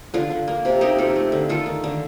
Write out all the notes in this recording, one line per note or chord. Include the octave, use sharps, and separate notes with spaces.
D3 D4 F4
D3
A#3
C3
A#3 D#4 G4
C3 F4 A4
A3
D3
D#3 F4 A4
D#3
D3